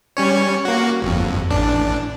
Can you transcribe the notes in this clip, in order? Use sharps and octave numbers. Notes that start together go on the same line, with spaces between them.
G3 C#4 C#5
A#3 F#4
G1 F2
A1 D4